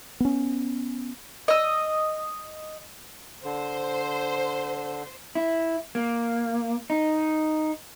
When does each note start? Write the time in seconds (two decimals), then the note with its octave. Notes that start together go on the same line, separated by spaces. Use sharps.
0.20 B3 C#4
1.48 D#5 E6
3.45 D3 C5
5.35 E4
5.95 A#3
6.90 D#4